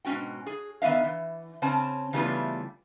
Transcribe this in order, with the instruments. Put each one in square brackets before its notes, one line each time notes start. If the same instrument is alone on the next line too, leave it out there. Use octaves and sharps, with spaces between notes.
[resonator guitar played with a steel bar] G#2 B2 C#4 F#4 G5
G#4
D#3 B3 F#4 E5 F5
E3
C#3 C4 C#4 A5
C#3 E3 G3 A3 B3 F4